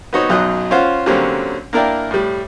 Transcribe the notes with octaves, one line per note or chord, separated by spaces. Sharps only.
B3 C4 D#4 F#4 C#5
B1 F#2 F#3 D#4 D#5 F#6
C#4 F4 C5 F#5
D3 F#3 G3 A#3 C4 C#4
A#3 D4 E4 A#4 D5 G5
A2 G3